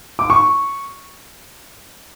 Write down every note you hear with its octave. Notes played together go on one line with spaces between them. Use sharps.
D6
C#6